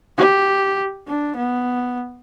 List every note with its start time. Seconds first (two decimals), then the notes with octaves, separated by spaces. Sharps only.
0.18 G4
1.07 D4
1.36 B3